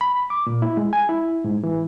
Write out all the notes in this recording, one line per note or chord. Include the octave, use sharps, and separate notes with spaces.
B5
D6
A#2
E4
G#3
G#5
E4
G#2
E3